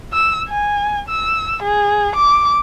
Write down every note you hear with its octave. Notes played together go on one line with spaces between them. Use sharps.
E6
G#5
E6
G#4
D6